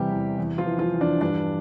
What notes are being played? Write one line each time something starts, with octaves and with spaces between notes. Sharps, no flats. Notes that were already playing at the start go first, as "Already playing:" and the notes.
Already playing: E2 C3 E3 G3 G4
E2
E2
F3 F4
E3
F3 F4
E2
D4
G2 D4